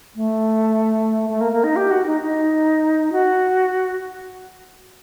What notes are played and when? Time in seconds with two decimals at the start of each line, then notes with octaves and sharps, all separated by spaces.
0.16 A3
1.29 A3
1.41 A#3
1.52 A#3
1.64 D#4
1.76 G4
1.91 F#4
2.06 D#4
2.21 D#4
3.12 F#4